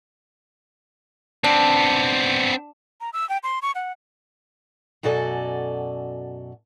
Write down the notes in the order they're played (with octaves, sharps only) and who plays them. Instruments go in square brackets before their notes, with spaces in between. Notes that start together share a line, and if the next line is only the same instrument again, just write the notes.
[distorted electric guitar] B3 C4 [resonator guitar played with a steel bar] D4
[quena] A#5
E6
G5
C6
C#6
F#5
[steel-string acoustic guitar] F#2 B2 F#4 A4 D5 G#5